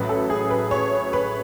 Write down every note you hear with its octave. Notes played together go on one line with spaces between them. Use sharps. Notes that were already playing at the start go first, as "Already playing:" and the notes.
Already playing: A1 A2 F#3 B4
A4
G#4
B4
C#5
B4